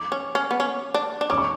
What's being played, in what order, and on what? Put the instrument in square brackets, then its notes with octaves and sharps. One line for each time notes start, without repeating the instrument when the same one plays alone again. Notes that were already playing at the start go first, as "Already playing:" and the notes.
Already playing: [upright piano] D6
[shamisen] C#4
C#4
B3
C#4
D4
D4
[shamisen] C#4 [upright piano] D6
[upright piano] C#6